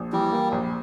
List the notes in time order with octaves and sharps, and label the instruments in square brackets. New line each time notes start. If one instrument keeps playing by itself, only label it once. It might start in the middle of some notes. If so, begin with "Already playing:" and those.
Already playing: [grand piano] A#1
[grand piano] E3 [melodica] G3
[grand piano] A#3
A#1